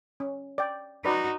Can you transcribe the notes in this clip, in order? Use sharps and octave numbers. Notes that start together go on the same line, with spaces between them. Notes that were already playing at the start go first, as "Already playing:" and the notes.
C#4
D5 G5
D#4 F#4 B4 D5